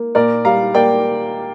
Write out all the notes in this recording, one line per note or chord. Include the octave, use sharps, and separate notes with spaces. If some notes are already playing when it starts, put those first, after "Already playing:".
Already playing: A#3
A#2 A#4 D5
G3 F5 A#5
A#3 D5 G5